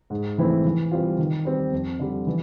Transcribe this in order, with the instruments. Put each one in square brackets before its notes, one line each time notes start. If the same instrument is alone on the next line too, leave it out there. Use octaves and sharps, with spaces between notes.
[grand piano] G#2
E3 A3 C4 E4
E3
G3 C4 F4
D#3
G3 C4
F2
D3 G3
E3